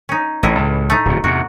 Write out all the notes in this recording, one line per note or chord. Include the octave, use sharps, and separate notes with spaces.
C#4 D#4
A1 A2 E4 D#5
C#2
A3 D#4
D1 F2 B2
E2 C3 F#4